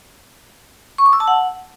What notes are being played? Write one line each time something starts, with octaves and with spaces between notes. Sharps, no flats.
C#6
D6
E6
A5
F#5